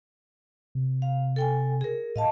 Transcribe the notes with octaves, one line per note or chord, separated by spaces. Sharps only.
C3
F5
A4 G5 G#5
G#4 A#4
A2 D#5 F5 A5